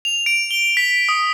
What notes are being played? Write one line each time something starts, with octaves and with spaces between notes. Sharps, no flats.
F7
D7
G7
B6
D#6